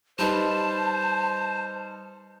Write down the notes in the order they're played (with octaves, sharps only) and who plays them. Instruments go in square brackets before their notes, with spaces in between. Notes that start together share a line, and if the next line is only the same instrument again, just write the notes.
[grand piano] G3 D#4 B4 [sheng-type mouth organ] C5 [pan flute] A5